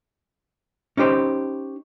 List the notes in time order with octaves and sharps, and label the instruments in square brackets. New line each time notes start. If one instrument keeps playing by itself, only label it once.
[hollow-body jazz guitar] C#4 D#4 G4 C5